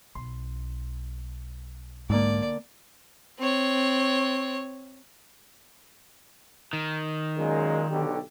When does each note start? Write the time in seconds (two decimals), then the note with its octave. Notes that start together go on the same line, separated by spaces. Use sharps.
0.15 B1 C6
2.10 G#2 D3 A#3 D5
3.39 C4 C#5
6.73 D#3
7.38 F#2 A#2 G#3
7.90 B1 D3 G4